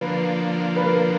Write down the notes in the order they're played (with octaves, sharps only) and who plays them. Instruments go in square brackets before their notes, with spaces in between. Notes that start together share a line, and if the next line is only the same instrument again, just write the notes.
[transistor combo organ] D3 F3 A#3 [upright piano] B4
[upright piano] B4
A#4